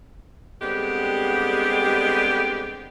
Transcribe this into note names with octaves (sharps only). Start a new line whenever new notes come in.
D3 G3 G#3 B3 C4 G4